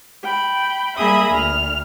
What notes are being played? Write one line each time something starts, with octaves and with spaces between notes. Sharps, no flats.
G5 B5
G3 A#3 G#4 E5 B5 D#6
D2 F6